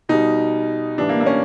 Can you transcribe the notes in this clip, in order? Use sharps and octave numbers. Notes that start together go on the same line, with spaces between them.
B2 G3 D#4
A2 E3 G3 D4
A#3
A#3
C#4